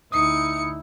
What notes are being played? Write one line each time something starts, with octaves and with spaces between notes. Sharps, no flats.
D2 D#4 E4 D#6 C#7